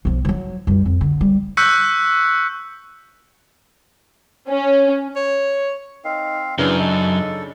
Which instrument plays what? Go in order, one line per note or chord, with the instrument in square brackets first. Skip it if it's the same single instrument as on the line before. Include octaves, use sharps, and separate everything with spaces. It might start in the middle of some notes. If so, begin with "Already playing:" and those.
[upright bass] B1 F3
E3 F#3
F#2 G3
F2
D3
G3
[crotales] C#6 E6 F#6 G6 B6 C#7
[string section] C#4
[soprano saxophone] C#5
[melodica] C4 F5 [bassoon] D#4
[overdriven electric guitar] F#2 [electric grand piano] C#3 D4 [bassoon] E3 [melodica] A#4
[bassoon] D#4 [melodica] A4